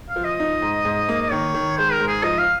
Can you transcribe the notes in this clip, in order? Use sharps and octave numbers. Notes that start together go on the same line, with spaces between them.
F5
F3
D#5
D#4
G#2
G#2
A#3
D#5
D#3 C#5
D#3
G#3 C5
A#4
G#2
G#4
F3 D#5
F5